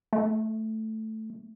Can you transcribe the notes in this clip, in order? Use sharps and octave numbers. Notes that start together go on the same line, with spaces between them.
A3